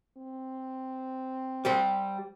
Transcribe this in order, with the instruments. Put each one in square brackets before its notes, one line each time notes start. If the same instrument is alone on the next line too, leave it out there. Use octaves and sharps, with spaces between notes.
[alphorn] C4
[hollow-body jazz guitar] G3 G4 C5